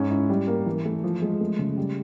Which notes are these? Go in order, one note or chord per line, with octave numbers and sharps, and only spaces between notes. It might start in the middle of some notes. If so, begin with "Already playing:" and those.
Already playing: G#2 C#4
E4
G3
A#3
E3
A3
F3
G#3
A3
C#3
G3